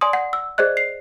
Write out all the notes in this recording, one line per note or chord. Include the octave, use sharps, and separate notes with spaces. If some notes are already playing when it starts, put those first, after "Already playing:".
D5 G#5 C6 D#6
F#5
E6
G#4 C5 D5 D#5 F#6
C7